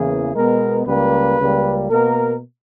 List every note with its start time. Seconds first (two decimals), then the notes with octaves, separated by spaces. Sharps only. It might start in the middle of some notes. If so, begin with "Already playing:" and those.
Already playing: E2 C#3 E3 A#3 G#4
0.35 B2 G#3 B3 A#4
0.86 C#2 C#3 G3 A#3 B4
1.38 C#2 C#3 G3 A#3
1.89 B2 A#3 A#4